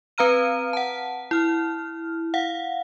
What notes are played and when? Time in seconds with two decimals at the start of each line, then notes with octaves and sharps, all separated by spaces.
0.18 C4 B4 F5 A#5 F6 D#7
0.73 F#5 A5
1.31 E4 F6
2.34 F5 F#5